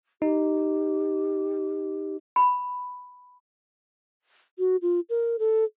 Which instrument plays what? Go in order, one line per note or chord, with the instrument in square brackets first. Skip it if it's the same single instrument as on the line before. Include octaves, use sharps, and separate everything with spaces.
[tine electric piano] D#4 [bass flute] G4
[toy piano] B5
[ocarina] F#4
F4
A#4
A4